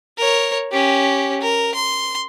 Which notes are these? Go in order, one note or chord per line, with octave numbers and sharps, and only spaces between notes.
A#4 C#5
C#4 G4
A#4
C6